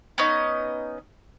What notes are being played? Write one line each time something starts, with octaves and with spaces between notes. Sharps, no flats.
B3 C#4 D#4 D#5